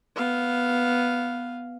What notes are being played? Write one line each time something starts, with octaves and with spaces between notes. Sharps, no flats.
B3 F5